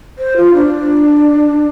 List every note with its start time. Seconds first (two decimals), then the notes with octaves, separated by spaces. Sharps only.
0.18 C5
0.37 F4
0.55 D4